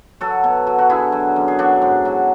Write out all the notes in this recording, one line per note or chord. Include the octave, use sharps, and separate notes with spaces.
F#3 F#4 A4
B2
F#3
F#4
D3 E4 G#4
F#3
F#2
G#4
F#3 D4 F#4
G#2
F#3